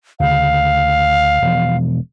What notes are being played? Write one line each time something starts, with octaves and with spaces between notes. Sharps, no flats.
D2 C#3 F5
E1 F3